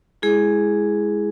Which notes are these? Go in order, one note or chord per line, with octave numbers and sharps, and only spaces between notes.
G#3 E4 G#4